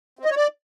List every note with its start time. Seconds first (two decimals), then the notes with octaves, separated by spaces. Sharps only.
0.19 C4
0.25 D#5
0.30 C#5
0.36 D5